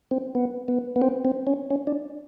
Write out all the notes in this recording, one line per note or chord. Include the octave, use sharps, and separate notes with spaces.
C4
B3
B3
B3
C4
C4
C#4
C#4
D4